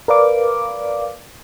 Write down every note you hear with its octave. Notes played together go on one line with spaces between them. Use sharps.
A#4 B4 D5 F5 D6